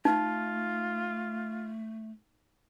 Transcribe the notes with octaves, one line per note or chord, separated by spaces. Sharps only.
A3 D#4 F4